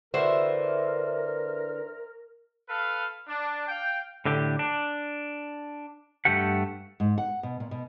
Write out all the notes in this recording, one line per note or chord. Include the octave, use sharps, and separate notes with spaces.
D3 E3 F#4 A#4 C5 E5
A4 B4 F5
D4
F5 G5
A2 D3 G4
D4
G2 A3 G4 F#5
G#2
F#5
B2
A#2
B2